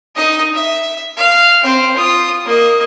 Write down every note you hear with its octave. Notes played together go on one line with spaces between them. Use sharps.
D#4 D#5
E5
F5
C4 C5
F4 D#6
A#3 D#5